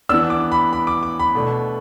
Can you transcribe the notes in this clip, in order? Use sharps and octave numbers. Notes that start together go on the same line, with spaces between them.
E3 B3 D4 E6
D6
B5
B5
D6
D6
B5
B2 A3 D4